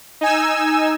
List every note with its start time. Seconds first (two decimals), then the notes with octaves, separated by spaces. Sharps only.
0.21 D#4 G#5 E6